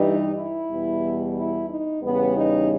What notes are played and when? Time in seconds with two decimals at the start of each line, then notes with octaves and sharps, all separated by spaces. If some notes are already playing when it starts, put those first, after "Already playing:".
Already playing: G2 E3 G3 D#4
0.36 E4
0.70 E2 B2 G3
1.37 E4
1.69 D#4
2.02 E2 C#3 G3 B3
2.36 D#4